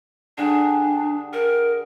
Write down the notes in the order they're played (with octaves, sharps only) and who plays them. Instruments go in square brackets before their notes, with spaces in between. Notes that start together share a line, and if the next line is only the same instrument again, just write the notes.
[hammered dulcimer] D3 G4 G#4 [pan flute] D4
[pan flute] A#4